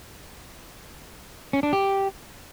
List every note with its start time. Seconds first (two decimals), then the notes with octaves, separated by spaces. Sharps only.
1.53 C#4
1.63 D4
1.73 G4